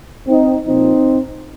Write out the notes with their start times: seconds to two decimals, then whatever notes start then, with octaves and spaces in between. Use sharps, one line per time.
0.27 C4 D#4
0.66 A#2 F3 C4 D#4